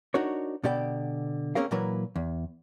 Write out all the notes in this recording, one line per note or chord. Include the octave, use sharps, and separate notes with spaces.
D4 D#4 F#4 A#4 C#5
B2 D3 B3 G4 D5 G5
A#3 C4 C#4 G#4 A#4 F5
A#2 E3 F#3 A#3 A#4 B4
E2